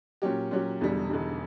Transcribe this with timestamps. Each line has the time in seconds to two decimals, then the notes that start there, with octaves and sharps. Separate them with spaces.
0.22 A#2 F#3 C#4 G4
0.51 A#2 F#3 C#4 G4
0.80 E1 E2 D3 G3
1.10 E1 E2 D3 G3